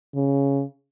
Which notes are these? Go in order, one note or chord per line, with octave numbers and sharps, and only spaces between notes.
C#3